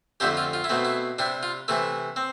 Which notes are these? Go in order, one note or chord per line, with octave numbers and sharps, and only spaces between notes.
F2 D3 A3 C4 E4 G4
F4
F4
E4
B2 A3 C4
E4
C3 G3 D4 E4
F4
C3 E3 A3 E4
C4